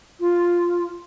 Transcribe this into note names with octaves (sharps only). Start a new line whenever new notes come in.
F4